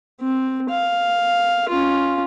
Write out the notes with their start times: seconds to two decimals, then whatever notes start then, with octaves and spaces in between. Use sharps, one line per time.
0.21 C4
0.70 F5
1.69 C#4 F4